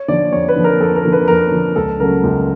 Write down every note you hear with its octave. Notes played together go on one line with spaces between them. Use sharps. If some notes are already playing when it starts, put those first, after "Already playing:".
Already playing: C#5
D3 F3 D5
F2 C#5
B4
D3 F3
A#4
F2 A4
A#4
D3 F3
B4
F2 A#4
D3 F3
C#2 A4
C#3 F#3 A3 A#4
C#2